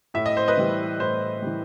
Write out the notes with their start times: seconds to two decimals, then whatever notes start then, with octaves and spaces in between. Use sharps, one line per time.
0.14 A2 E5
0.26 D#5
0.37 C5
0.48 B4 D#5
0.57 E3 G3
1.00 A2 C5
1.42 E3 G3